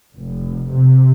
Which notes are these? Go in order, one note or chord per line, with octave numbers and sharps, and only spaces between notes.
F1
C3